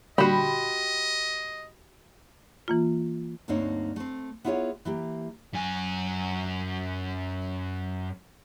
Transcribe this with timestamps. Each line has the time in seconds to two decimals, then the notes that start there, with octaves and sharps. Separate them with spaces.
0.18 A#2 D3 G3 F#4 G4 D#5 B5 C6
2.68 E3 A#3 F4
3.48 D2 G2 A#3 C4 D#4 C#5
3.96 A3 C4
4.44 B3 E4 F4 G#4 B4 C#5
4.85 E3 A#3 G4
5.53 F#2 G#5